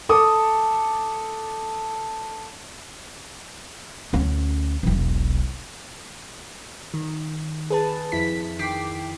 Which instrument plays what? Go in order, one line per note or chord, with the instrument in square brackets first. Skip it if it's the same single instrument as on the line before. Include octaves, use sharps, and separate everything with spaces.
[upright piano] A4 A5 D6 D#6
[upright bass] D2 C#4
E1 B1
[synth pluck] D#3
G#4 B4 A5
F2 E4 B6
D#3 G5 D6 B6 C7